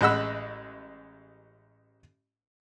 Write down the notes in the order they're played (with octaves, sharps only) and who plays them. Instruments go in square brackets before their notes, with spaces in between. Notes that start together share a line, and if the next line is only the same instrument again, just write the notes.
[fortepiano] A1 G#3 D#5 F#5 B5 E6